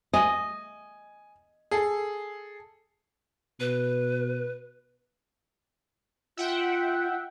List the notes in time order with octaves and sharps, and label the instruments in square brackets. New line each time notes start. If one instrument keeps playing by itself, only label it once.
[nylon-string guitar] D#5 [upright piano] G#5
[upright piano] G#4 A4
[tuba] B2 [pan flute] B4
[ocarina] F4 [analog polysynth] E5 F#5 G5